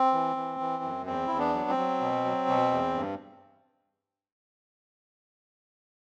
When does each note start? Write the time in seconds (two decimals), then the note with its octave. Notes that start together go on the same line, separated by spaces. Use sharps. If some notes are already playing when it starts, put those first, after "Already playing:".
Already playing: C4
0.13 E3
0.36 E3
0.60 E3
0.83 F#2
1.06 E2 C4
1.27 E2 E4
1.38 B3 D4
1.54 F#3
1.70 C4
1.78 F#3
2.01 B2
2.25 F#3
2.48 B2
2.71 E2
2.95 G2